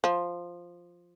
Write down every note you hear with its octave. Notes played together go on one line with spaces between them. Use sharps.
F3